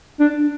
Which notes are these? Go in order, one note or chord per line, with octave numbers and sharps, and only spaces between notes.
D4